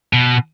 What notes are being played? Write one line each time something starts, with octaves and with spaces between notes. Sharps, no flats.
B2